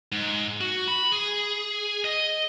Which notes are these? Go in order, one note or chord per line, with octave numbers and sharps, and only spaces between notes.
G#2
F#4
B5
G#4
D#5